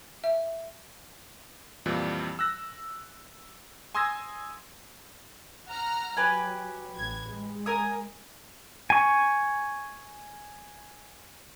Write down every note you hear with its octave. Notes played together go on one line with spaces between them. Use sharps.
E5
F2 A#2 E3 G3
E6 F#6 A#6
G#5 C6 D#6 E6 G#6 A#6
F#5 A#5 F6
F#3 G4 B4 G#5
A1 G#6
G#3
A#4 G#5 D#6
G#5 C#6